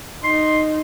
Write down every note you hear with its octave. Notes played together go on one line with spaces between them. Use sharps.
D#4 C6